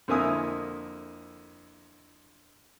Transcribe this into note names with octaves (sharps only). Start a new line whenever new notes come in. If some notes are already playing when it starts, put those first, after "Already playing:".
F2 D3 A#3 E4 G#5 D#6